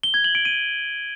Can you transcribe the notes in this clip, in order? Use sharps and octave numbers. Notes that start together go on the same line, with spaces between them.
G7
G#6
F#7
D7
D#7